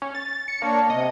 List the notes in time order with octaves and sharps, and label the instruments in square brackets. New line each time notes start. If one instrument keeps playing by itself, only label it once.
[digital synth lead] C#4
A6
C#7
[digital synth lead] A#3 [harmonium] D4 C#5
[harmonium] C3 [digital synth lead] D#5